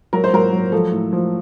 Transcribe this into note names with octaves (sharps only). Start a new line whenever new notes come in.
F#3 A#4
C5
F#3 A#4
F#3
F3 A4
A2
F3